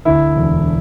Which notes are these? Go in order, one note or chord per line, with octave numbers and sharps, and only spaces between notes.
D2 E4
E1